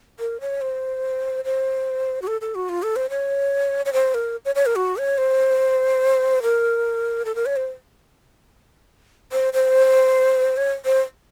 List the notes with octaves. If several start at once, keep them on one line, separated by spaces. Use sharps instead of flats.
A#4
C#5
C5
C5
F#4
A4
A4
F#4
F4
A4
C5
C#5
C#5
C5
A#4
C#5
C#5
A#4
F#4
C#5
C5
A#4
A4
A#4
C#5
C5
C5
C5
C#5
C5